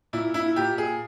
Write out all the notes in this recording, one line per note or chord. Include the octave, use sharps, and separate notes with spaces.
A#2 E4
E4
A#2 G4
G#4